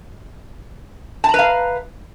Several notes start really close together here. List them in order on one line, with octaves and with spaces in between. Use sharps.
A5 A#5 B4 F5